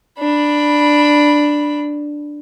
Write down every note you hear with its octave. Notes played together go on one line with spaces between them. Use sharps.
D4 B5